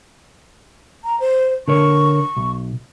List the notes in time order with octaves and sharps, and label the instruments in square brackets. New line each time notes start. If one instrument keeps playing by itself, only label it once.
[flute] A#5
C5
[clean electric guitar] D3 A#4 C#5 [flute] C#6
[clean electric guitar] B1